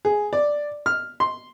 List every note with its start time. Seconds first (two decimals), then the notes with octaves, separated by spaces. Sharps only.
0.05 G#4
0.33 D5
0.86 F6
1.20 C6